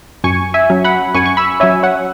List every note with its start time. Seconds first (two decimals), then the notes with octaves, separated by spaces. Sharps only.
0.24 F#2 G#5 C#6
0.54 E5 G#5
0.70 F#3 C#4
0.84 F#5 B5
1.15 F#2 G#5 C#6
1.26 C#6
1.37 B5 E6
1.60 F#3 C#4 E5 G#5
1.83 C#5 F#5